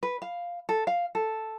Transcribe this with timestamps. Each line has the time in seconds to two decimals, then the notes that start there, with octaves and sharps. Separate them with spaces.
0.03 B4
0.22 F5
0.69 A4
0.87 F5
1.15 A4